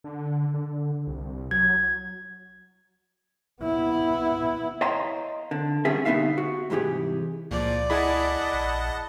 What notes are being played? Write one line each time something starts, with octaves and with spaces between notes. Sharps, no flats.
D3
D3
C2
F#3 G#6
B3 E4
C#5 D#5 F5 G5 A#5 C6
D3
G3 B3 C#4 G#4 E5
D3 G3 B3 D#4 E5 F5
F#4
C2 G#2 E3 G4 G#4
C#2 A#2 F3 D5
E4 G#4 D#5 F#5 A5 B5
A#1